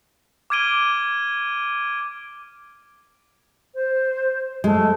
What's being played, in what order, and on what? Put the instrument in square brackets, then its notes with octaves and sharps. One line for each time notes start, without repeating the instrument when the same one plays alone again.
[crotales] D6 F6 G#6 D7 D#7 G7
[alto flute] C5
[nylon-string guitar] G#3 [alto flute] A3